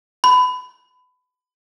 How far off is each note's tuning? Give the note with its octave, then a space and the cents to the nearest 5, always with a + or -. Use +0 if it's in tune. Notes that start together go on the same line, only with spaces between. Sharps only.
B5 +25